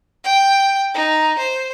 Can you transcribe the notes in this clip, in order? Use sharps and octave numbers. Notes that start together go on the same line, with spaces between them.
G5
D#4
C5